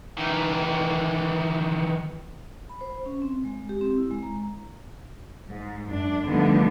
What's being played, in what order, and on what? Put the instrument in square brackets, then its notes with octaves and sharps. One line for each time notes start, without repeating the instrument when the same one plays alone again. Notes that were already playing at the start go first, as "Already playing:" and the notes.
[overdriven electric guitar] D#3 E3
[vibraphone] B5
C5
C#4
C4
G#3
G4
C4
E4
G#3
A#5
[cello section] G#2
F#2 D4
D3 D#3 F3 G3 A3 B3